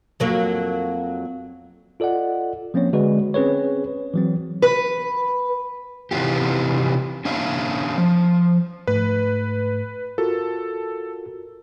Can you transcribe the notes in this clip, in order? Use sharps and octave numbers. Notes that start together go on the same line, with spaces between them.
F2 F#3 A#3
F4 A4 D5 D#5 F#5
F3 A#3 C4 C#4 C#5
D3 G#3 F#4 B4 D5
C4 C#4 G#4 B4 C#5
E3 F#3 C4
B4
C3 E3 D#4 F4 G4
C#4 D4 E5 F5
F3
G#2 A3 B4
F4 F#4 A4 A#4